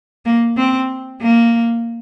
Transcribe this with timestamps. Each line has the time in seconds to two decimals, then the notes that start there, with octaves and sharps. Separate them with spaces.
0.26 A#3
0.57 C4
1.21 A#3